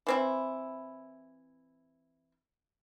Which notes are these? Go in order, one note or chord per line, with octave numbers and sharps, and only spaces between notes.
E3 C4 E4